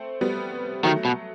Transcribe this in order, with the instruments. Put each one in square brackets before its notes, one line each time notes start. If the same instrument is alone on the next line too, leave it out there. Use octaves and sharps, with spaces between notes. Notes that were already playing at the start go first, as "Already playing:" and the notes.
Already playing: [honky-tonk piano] A3 C4
G3 B3
[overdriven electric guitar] D#3 [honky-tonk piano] F#3 A3
[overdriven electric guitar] B2